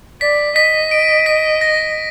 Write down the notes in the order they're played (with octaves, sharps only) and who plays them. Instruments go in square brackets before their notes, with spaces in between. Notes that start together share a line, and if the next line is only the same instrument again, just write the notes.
[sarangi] D5 [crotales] B6
[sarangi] D#5 [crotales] B6
[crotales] D7
B6
A#6